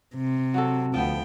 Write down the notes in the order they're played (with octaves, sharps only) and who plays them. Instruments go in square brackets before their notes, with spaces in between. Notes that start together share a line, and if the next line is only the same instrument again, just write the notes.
[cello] C3
[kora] F#3 F#4 A4
[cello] D2 G5 [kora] F3 B3